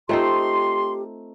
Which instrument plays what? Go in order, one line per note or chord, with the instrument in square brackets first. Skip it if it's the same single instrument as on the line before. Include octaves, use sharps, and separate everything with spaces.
[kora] A3 C4 D#4 [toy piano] F4 C5 D#5 [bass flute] G4 [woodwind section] C6